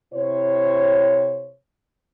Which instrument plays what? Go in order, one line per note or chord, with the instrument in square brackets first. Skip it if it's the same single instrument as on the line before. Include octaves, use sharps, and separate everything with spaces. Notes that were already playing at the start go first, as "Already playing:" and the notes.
[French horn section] C3 E4 C5 C#5